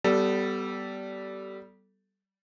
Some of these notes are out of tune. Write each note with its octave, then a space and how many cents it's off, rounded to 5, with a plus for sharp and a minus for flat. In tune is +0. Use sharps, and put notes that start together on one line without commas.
G3 -20 B3 +0 A4 +0